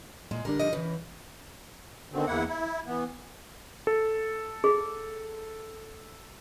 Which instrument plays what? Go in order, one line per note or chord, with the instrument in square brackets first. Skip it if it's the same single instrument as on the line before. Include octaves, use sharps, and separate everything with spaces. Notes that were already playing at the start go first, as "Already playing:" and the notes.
[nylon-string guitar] A#2 [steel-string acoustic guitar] G#3
[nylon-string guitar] D3 G3 D4 [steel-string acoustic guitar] A#4
[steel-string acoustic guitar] D#3 F3 D#5
[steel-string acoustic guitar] C#3 [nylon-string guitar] E3 B4
[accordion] B2 D3 D#3 C4
E2 A#3 E4 F#5
E4
E3 B3
[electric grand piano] A4
[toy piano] G#4